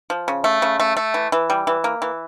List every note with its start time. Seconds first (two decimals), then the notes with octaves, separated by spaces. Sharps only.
0.10 F3
0.28 C#3
0.44 A3
0.62 C#3
0.80 A3
0.97 A3
1.14 E3
1.32 E3
1.50 G3
1.67 E3
1.84 A#3
2.02 E3